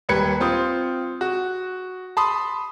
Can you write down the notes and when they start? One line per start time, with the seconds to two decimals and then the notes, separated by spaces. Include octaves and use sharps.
0.09 D#1 G3 B4 G#6 C#7
0.40 C4 F4 D#6
1.21 F#4
2.17 A5 B5 C6 D#6